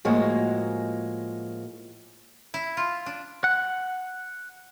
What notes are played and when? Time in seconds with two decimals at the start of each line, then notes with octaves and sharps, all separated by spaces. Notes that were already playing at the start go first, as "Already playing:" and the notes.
0.05 A2 F3 G#3 A#3 F#4
2.54 E4
2.77 F4
3.06 D4
3.44 F#5